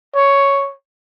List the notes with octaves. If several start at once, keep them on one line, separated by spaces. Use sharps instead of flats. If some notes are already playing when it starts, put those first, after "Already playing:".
C#5